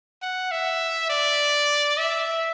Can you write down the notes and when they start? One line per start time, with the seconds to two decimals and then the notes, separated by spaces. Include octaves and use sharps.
0.22 F#5
0.52 E5
1.10 D5
1.98 E5